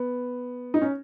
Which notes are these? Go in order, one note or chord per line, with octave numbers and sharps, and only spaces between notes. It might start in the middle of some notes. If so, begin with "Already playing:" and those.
Already playing: B3
D#4
C#4